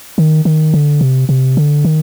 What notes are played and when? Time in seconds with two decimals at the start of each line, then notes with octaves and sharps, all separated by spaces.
0.18 D#3
0.45 D#3
0.74 D3
1.01 C3
1.29 C3
1.57 D3
1.85 D#3